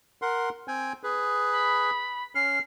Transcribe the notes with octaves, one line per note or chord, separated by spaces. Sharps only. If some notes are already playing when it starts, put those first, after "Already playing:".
A#4 F#5 C6
C4 G5 G#5
G#4 B4
B5
C#4 F6 C7